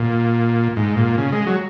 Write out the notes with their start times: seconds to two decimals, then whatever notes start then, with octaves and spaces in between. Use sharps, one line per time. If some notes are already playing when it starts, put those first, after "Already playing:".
Already playing: A#2
0.76 G#2
0.97 A#2
1.18 C#3
1.32 G#3
1.47 F#3